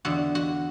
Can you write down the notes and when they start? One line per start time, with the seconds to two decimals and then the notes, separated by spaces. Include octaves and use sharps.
0.05 E2 D3 F#4
0.35 F#4